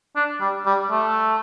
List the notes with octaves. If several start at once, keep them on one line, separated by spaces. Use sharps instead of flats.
D4
G3
G3
A3